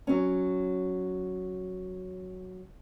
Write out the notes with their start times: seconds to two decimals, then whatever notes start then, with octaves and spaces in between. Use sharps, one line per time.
0.07 F#3 C#4